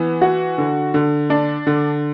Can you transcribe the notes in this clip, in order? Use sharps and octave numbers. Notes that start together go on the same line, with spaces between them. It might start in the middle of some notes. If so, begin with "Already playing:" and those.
Already playing: E3 B3
F#4
D3
D3
D4
D3